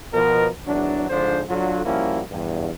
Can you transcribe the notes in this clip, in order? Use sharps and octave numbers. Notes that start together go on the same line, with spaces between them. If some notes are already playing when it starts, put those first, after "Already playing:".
B2 F3 A#4
G#1 E2 F#3 D4
G#2 D3 F3 D4 C5
D3 F#3 F4
F3 G3 A#3 C#4 E4 F#4
E2 G2